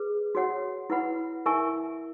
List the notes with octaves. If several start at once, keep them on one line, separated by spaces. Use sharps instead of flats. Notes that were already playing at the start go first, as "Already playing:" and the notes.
Already playing: G#4 B4
F#4 C#5 F#5
E4 B4 F#5 B5
E4 A#4 E5 G#5 C#6